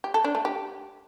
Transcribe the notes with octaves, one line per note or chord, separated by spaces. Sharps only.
G4
A4
D4
A3
G4